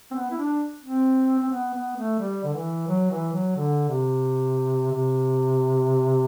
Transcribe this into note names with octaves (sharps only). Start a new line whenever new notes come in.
C4
B3
E4
D4
C4
C4
B3
B3
A3
G3
D3
E3
F#3
E3
F#3
D3
C3
C3